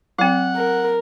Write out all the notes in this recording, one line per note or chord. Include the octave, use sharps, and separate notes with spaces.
F#3 C4 F#5
A#4